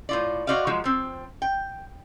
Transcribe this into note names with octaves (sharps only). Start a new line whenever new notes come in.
A2 F4 D5
F#4 C5 D5 D#5 F5
F3 F#3 G#3
F3 C4
G5